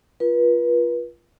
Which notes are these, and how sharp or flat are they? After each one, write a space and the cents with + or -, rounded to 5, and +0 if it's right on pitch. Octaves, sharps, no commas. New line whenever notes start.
F4 -10 B4 -35